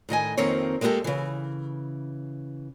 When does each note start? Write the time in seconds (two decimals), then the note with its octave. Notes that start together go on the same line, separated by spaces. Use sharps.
0.09 A2 D#3 D#5 G#5
0.37 F2 D#3 A#3 C4 C#5
0.81 G#3 A#3 C#4 E4 G4 A4
1.04 C#3 E3